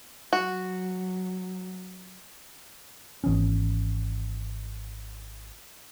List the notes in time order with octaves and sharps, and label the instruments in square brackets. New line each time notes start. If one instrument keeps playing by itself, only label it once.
[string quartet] F#3 [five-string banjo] F#4
[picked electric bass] G#1 E3 B3 C#4